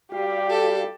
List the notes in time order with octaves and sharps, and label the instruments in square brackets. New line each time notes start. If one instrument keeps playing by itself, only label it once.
[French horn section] G3 [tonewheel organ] F#4 F5 [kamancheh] G4
[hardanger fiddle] A4